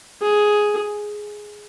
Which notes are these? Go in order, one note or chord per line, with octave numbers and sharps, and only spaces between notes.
G#4